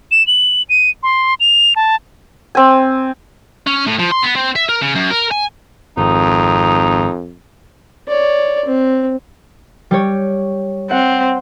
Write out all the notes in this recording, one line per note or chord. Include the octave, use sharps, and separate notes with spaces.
E7
F#7
D#7
C6
F7
A5
C4 G#5
C#4
A2
F3
C6
B3
C4
E5
A#4
C#3
F#2
A#4
G#5
G#1 F2 D#4
C#5 D5
C4
G3 G4 C#5
C4 F#5